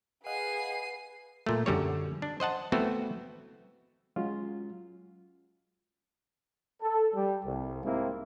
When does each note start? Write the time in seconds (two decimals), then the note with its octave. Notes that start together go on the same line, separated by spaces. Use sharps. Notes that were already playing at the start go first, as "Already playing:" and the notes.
0.26 G#4 B4 D#5 F5 F#5 C7 D#7
1.46 A#2 A3
1.66 F#2 D3 G3 C#5
2.22 D4
2.40 C5 D#5 F#5 A5
2.72 A3 B3 C4 E4 F#4
4.16 F#3 G#3 C#4 F4
6.81 A4
7.14 G3
7.45 C2
7.83 G#2 C3 A#3 C4 E4